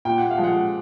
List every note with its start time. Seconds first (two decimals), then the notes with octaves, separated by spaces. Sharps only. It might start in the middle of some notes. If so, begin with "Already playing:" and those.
0.05 A#2 G5
0.18 F#5
0.31 F5
0.37 F3 G#3
0.44 F#5